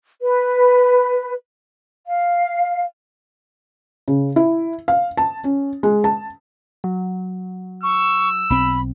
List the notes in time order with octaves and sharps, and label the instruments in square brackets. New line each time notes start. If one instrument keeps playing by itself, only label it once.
[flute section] B4
F5
[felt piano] C#3
E4
F5
A5
C#4
G#3
A5
[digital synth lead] F#3
[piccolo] C#6 [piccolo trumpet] E6
[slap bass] B1 C4 [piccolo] B5